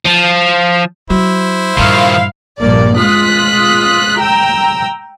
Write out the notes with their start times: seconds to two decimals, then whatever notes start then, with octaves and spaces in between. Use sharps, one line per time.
0.06 F3
1.10 F#3 E4 C5
1.77 G2 A#2 D#3 F3 F5
2.59 A#1 G2 A#3 D5
2.98 G#3 F4 D#6 F#6 B6
4.19 G5 A#5 E6